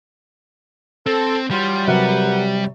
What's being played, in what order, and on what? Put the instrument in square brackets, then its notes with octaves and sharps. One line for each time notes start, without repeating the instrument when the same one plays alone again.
[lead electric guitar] C4 [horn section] A4
[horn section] E3 F#3 F4 [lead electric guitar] G3
[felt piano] C3 F#3 [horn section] A#4 B4 F#5